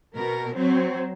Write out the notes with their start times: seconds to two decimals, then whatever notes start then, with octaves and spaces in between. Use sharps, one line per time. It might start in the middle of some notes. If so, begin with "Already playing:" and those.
0.15 B2 A#4
0.56 F#3 C4